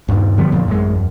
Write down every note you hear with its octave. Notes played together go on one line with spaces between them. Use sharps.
D#1 G2
D3 F3 G3 B3
F2 A#2
A1 F#2 G#3
E2